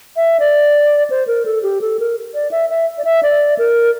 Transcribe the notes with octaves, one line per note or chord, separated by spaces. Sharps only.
E5
D5
C5
A#4
A4
G4
A4
A#4
D5
E5
E5
D5
E5
D5
A#4